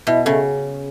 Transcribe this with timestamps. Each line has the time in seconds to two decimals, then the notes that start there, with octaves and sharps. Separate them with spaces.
0.07 B2 E4
0.26 C#3 A3